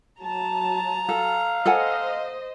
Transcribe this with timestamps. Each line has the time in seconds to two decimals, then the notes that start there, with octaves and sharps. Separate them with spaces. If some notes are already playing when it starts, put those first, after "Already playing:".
0.21 F#3 A5 A#5
1.09 A4 F5
1.66 A4 C5 D#5 F#5 G#5